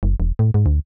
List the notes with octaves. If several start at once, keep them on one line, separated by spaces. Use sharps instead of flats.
F#1
E1
A2
G#2
D2